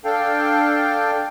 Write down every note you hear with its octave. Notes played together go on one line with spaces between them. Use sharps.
D4 A4 F5 G5